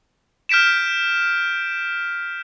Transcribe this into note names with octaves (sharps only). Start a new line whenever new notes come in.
F6 G6 B6 D7 E7